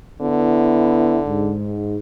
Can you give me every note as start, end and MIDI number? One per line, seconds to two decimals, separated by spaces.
0.21 1.56 50
0.21 1.20 59
0.21 1.20 64
1.26 1.97 44